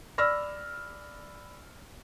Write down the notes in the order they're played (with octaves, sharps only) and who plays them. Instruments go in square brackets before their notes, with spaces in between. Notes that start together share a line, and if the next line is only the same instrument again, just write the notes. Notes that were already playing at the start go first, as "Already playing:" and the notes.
[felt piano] D5 B5 E6 F6 A#6